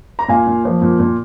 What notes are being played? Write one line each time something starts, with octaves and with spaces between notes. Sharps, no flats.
A#5
A#2 F5 G#5
A#2
F3
A#2
A#2